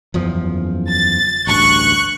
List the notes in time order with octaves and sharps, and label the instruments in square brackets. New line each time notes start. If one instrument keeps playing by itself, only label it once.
[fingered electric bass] F#1 E2 F3
[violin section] A6
[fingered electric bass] A1 D2 G2 [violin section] C#6 F#6